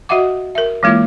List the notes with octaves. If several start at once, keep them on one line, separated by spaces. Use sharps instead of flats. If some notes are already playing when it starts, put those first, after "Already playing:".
F#4 D#5 E5 F#5 D6
A#4 E5
E3 G#3 A#3 E4 F4